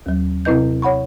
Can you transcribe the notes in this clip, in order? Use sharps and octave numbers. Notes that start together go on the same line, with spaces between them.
D#2 F#3
C3 C4 E4 B4 D#5 G6
C#5 F#5 B5 C#6